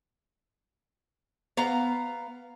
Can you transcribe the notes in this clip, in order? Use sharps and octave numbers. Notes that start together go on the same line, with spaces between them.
B3 F5 A#5